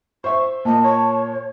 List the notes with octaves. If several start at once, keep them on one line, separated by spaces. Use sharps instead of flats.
C5 E5 C#6
A#2 D#5 A5
C#5